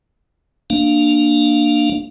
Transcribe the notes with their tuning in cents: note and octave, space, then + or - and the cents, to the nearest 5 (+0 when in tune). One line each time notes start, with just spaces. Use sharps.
A#3 +0 D4 +15 F5 +0